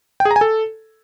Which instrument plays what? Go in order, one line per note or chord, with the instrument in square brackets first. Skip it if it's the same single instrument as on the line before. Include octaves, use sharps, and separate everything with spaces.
[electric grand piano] G5
G#4
A#5
G#5
A4